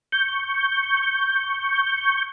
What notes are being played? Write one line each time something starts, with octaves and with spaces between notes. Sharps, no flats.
C#6 G6